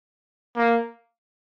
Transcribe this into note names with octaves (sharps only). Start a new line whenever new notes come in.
A#3